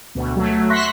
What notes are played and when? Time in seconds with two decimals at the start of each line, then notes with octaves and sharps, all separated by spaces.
0.15 D2 B2
0.36 F#3 A3
0.70 E5 C6 C#6 F#6 A#6 B6